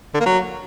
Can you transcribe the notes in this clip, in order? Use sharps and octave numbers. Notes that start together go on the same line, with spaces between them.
D3
A#3
F#3